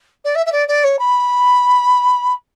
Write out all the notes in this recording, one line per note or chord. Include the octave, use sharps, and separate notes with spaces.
D5
E5
E5
D5
D5
C#5
B5